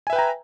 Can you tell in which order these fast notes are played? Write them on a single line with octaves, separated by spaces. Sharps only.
G#5 E5 B4 G5 A#5